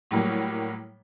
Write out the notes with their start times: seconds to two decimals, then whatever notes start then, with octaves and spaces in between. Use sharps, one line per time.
0.11 A2 F#3 G3 A#3